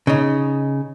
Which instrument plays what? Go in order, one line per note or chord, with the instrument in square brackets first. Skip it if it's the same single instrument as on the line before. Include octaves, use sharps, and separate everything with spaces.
[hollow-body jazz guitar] C#3 D#4